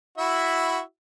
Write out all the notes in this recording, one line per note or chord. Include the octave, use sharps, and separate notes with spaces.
E4 F#4 E5